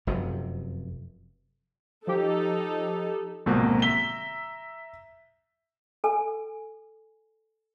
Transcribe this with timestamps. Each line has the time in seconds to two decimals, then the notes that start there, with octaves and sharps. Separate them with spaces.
0.07 F1 F#2 C3
2.07 F3 D#4 G4 A4
3.46 D1 A#1 G#2 B2 A#3 C4
3.82 E5 A#5 B6 G7
6.04 A4 G#5